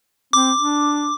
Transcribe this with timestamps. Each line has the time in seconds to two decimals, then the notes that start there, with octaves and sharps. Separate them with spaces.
0.33 C4 D6
0.57 D4